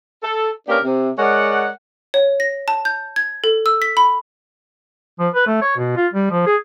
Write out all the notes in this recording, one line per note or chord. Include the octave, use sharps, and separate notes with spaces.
A4
A#3 C#4 D4 G4 A#4 B4
C3
G#3 A#4 C#5 D5 F#5
C#5
A#6
A5
G6
G#6
A4
E6
B6
B5
F3
B4
A3
C#5
B2
F4
G3
F3
G#4